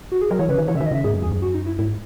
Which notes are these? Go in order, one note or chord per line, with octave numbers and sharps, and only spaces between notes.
F#4
G#4
F#3 A#4
E3 C#5
C#3 B4
D#3
E3 C#5
C#3 E5
D#3
D#5
C#3 E5
G#2 G#4
F#2
E2 G#4
F#2
F#4
D#4
E4
G#2 E4